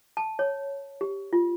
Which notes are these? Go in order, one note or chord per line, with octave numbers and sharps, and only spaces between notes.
A5
C#5
G4
F4